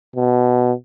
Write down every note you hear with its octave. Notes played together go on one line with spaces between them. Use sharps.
B2